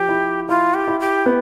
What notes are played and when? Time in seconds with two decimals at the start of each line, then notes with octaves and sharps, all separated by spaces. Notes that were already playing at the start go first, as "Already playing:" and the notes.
Already playing: F3 G4
0.09 E4
0.48 E4 F4
0.74 G4
0.88 E4
1.00 G4
1.26 B3